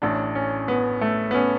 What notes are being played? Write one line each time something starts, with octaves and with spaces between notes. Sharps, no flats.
A1 A2 D4
C#4
B3
A3
B3
C#4